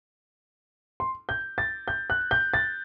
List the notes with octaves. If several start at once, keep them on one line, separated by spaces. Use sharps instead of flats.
C6
G6
A6
G6
F#6
G6
A6